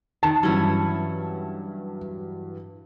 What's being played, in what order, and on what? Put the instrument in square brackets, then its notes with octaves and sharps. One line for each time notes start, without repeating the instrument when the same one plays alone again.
[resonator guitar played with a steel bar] D#3 [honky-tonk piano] A5
[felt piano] G2 E3 F#3 [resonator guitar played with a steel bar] C#4 E4